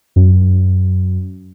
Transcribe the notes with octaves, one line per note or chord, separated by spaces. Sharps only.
F#2